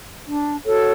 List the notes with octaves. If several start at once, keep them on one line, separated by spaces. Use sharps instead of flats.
D4
F#4 A4 C#5